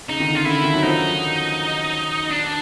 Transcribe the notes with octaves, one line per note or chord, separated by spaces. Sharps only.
C#3 D#4
D#3
D3
F4
D3 E4
D#3
F#3
F3 D#4
D4